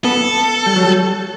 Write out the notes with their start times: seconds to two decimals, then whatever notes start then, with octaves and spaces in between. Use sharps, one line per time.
0.05 B3 A4
0.66 G3
0.76 F#3
0.86 G3